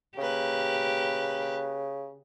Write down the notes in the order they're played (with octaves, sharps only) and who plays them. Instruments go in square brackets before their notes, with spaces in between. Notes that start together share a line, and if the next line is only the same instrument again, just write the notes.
[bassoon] C#3 [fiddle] A#3 B4 [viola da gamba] G4